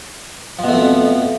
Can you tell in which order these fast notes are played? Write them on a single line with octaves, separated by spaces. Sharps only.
F3 B2 A3 F2